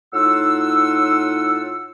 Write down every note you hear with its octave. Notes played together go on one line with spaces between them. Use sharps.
A2 D#4 F4 F#5 E6